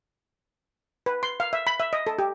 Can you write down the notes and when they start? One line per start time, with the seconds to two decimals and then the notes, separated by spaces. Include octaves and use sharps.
1.06 B4
1.23 C6
1.40 F5
1.53 E5
1.67 B5
1.80 E5
1.93 D#5
2.07 A4
2.19 G4